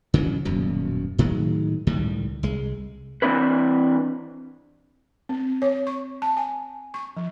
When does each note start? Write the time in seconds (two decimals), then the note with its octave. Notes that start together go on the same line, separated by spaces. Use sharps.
0.14 C#3 E3 F#3
0.45 D#1 F#2 B2
1.18 A2 D#3 F#3 G#3
1.87 C#2 A2 D#3 G3
2.43 C2 G#3
3.22 E3 A#3 C4 D4 E4 B4
5.29 C4
5.62 C#5
5.87 C#6
6.22 A5
6.37 G#5
6.94 C#6
7.17 F3